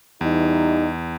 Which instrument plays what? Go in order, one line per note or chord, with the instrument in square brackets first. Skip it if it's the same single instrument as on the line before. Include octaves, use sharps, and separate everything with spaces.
[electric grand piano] E2 [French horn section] E3 G3 D#4